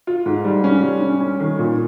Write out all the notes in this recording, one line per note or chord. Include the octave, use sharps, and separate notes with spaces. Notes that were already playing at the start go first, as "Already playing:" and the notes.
F4
G#2
G3
C#4
G3
C#4
C#4
D#3
A#2